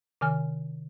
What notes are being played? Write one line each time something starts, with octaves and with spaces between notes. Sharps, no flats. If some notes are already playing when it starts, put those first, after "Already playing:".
C3 D#3 G#5 F6